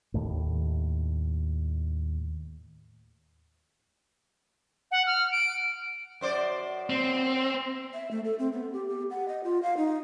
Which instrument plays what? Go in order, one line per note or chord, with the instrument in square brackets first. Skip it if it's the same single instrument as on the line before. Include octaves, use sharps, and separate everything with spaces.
[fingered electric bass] D#2 A2
[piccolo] F#5
F6
D7
[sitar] F#2 C5 D5
[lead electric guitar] C4
[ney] E5
A3
A4
C4
B3
G4
G4
F#5
D#5
F4
F5
D#4